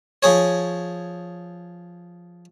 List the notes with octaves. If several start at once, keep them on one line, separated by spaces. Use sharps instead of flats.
F3 G#4 C#5